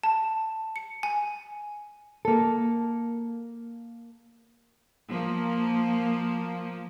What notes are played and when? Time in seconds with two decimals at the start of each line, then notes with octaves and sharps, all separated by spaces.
0.03 A5
0.76 C#7
1.03 G#5
2.25 A#3 A4
5.09 F3 A#3